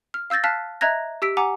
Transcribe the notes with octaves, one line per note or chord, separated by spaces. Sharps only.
F6
F5 E6 G6 A6 A#6
F5 A5 F6 F#6 B6
D#5 E5 A#5 F#6 G#6 A#6
G4 E6 B6 D7
F#5 G#5 A#5 D6